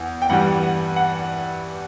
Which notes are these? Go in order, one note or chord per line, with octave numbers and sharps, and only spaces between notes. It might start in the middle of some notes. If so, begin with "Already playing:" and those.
Already playing: E2
G5
G2 E3 G3 F#5
F#5
F#5